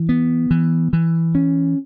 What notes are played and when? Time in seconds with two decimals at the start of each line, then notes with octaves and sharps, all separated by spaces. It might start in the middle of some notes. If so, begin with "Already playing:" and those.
Already playing: E3
0.09 B3
0.51 E3
0.93 E3
1.35 C#4